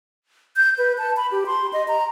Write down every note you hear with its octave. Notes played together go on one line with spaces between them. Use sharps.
G6
B4
A5
B5
G4
C6
D#5
A#5